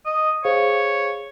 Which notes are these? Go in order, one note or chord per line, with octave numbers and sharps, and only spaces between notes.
D#5
G#4 C5 C#5 F5